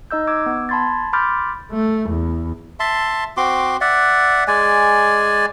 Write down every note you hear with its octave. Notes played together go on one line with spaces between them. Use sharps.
D#4 D#5 E6 G6
D6 E6 G#6
B3
A5 B5 C6 G#6 A6
B5 C6 D6 F6 G6 A6
A3
E2
E5 A5 C6
C4 F#4 C6 D6
D5 E5 F#5
G#3 D5 G#5